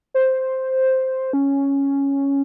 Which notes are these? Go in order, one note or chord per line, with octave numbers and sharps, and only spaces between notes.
C5
C#4